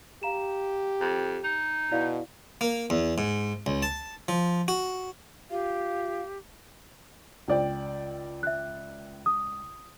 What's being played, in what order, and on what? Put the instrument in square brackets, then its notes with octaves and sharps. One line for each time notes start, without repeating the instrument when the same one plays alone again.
[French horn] G4 [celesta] F5 A#5 E7
[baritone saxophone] F2
D#4
[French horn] B2 [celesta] E4 D5 F5
[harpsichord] A#3
E2
G#2
C#2
A5
F3
F#4
[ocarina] F4 [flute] G4 [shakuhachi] F5
[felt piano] C#2 D5 G5
[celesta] E5 F#6
D#6